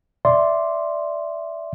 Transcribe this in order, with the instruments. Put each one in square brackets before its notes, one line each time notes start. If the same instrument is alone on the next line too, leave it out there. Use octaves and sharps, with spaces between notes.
[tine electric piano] D5 E5 C6